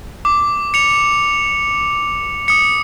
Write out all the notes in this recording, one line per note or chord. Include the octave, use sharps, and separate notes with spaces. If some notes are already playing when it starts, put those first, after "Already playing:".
D6
C#7 F7
D#6 C#7